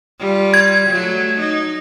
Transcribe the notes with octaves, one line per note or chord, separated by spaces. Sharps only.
G3 F4
G#6
F#3 A3
D#4